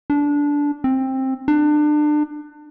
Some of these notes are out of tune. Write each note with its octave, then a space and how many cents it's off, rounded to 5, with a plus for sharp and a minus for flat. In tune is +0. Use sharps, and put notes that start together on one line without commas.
D4 -15
C4 +15
D4 +30